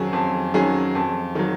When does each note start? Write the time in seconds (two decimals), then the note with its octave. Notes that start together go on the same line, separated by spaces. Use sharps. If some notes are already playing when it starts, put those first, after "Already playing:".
Already playing: F2 D#3 F#3 C#4 G#4
0.13 F2
0.54 D#3 F#3 C#4 G#4
0.95 F2
1.35 D#3 F#3